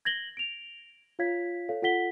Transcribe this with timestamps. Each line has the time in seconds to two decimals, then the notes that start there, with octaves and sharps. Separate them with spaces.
0.05 G#6 A#6 F#7 G7
0.37 D7 F7
1.19 F4 C#5 F5 G#6 B6
1.69 A4 C#5 F5
1.82 F4 A4 F#5 B6 G7